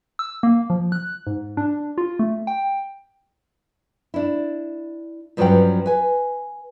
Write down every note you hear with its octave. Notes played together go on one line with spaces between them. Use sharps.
E6
A#3
F3
F#6
G#2
D4
F4
A3
G5
D4 E4
G2 F3 F#3 C#4 B4 G5
B4 G#5